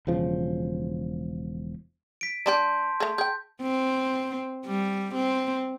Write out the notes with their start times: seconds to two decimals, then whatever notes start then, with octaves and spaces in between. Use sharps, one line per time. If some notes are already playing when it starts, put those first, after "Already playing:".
0.07 E1 C#3 F3
2.21 B6 D7
2.46 G3 D4 G4 A5 C6 G6
3.00 A3 G#4
3.18 G#4 G5 G6
3.62 C4
4.66 G3
5.15 C4